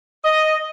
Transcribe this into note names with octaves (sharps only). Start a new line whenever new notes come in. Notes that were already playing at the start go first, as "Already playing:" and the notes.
D#5